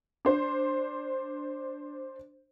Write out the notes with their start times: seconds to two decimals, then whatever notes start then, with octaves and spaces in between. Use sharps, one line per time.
0.25 D4 C5